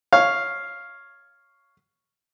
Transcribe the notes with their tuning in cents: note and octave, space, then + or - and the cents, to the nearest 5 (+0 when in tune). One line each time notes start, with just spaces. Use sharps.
C#5 +0 F5 +0